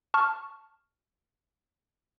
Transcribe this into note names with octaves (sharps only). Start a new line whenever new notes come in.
A5 C#6 F6